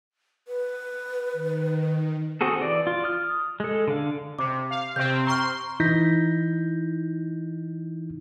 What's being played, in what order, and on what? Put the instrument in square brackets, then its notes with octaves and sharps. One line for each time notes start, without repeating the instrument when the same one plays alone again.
[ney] B4
[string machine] D#3
[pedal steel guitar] C4 F#4 G#4 A4
E3 D5
F4
D#6 F6
G#3 A4
D3 F5
[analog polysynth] C3 [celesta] D6
[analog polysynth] F5
[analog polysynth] C3 C4 [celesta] G6
[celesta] A#5 C#6 F6 [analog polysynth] C6
[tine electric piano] E3 D#4 E4 G6 A#6 B6